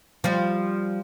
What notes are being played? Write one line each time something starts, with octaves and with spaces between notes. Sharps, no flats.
F3 G3